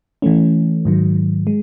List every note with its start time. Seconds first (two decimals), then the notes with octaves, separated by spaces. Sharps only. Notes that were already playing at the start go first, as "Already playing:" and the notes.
0.22 E3 A3 C#4
0.85 G#2 D#3 F#3
1.47 G#3